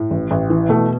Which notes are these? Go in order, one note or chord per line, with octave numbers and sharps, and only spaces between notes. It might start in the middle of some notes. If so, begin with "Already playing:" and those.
Already playing: A2
A1
A1
E3
B2 A3